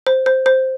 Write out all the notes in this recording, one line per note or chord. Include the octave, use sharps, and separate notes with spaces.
C5
C5
C5